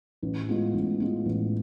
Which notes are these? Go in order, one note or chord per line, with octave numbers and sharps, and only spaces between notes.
A1
A2 G#3 B3 F4
A1
A2 G#3 B3 F4
A1